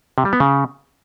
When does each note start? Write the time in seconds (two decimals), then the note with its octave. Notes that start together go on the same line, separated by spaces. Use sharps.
0.18 C3
0.25 G3
0.33 B3
0.40 C#3